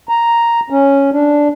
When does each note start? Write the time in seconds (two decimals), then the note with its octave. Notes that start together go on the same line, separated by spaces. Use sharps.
0.09 A#5
0.70 C#4
1.12 D4